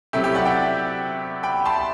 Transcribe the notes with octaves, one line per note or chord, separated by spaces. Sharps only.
C3 F#3 A3 E4 G4
E4 G4
D5 F#5
E5 G5
G5 B5
A5 C6